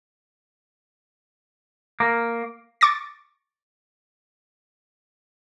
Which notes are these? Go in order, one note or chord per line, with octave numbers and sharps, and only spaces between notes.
A#3
C#6 D6 A6 A#6